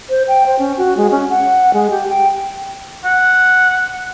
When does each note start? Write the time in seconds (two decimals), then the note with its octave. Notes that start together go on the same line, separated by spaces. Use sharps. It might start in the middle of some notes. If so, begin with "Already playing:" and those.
0.09 C5
0.28 G5
0.46 C5
0.59 C#4
0.78 F#4
0.97 G#3
1.11 C#4
1.30 F#5
1.74 G#3
1.90 G4
2.08 G5
3.04 F#5